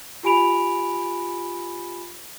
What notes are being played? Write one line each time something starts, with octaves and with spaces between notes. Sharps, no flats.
F4 G4 G#5 B5 D7 F7